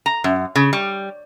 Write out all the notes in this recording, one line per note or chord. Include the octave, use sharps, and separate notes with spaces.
A#5
F#2
C#3
G3